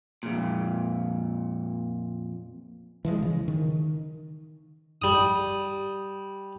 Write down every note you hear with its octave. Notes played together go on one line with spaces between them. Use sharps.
F2 A#2
E3 F3 G#3
C#3
D#3
G3 D#6